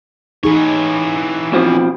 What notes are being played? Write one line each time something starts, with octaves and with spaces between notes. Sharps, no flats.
E3 D#4 G#4 C#5
B2 F3 C4